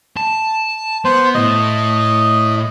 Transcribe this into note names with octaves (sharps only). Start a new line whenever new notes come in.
A5
B3 C5
A2 D#5